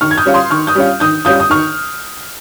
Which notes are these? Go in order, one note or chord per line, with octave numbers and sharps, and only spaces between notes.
D#3 C#6 F6
G#6
D#6 G6
G3 C#4 F4
C6 D#6
D#3 C#6 F6
D#6 G6
G3 C#4 F4
D#3 D#6 G6
G3 C#4 F4 D#6 G6
D#6
D#3 C#6 F6